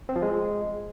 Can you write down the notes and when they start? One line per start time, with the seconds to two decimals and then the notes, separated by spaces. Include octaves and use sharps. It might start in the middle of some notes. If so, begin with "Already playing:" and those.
0.09 C4
0.16 F3
0.22 G#3